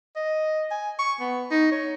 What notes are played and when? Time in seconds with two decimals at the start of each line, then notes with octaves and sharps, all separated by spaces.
0.16 D#5
0.71 G#5
0.99 C#6
1.21 B3
1.51 D#4
1.72 C#5